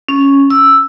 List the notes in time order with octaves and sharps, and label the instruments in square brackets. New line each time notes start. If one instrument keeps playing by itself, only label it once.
[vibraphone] C#4
E6